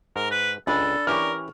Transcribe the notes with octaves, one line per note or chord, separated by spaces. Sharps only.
G#2 A#4
B4
C#2 D4 A4 G#5 B5
E3 C#4 G4 A#4 C#6 D6 F6